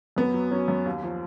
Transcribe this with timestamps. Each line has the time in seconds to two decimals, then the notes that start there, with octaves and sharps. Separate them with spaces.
0.16 F#2 B3
0.34 F#3
0.51 F#3 C#4
0.68 F#2
0.86 D#2
1.03 F3